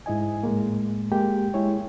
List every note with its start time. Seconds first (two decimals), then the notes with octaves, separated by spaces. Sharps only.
0.06 G#2 E4 D#5 G#5
0.43 A2 G#3 A#3
1.12 G#3 A#3 G4 G5
1.54 G#3 E4 G#4 C#5